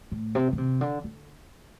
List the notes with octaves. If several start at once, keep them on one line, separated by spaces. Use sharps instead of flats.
A2
C3
D3
C3
D3
D3